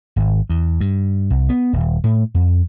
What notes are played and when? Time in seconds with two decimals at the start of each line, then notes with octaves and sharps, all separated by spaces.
0.16 G#1
0.50 E2
0.81 G2
1.30 C2
1.49 B3
1.73 D#1
2.04 A2
2.35 F2